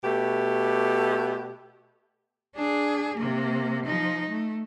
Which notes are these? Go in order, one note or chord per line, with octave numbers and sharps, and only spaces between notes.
B2 A3 G4
D4 G#4
C3 A#3
F3 D#4
A3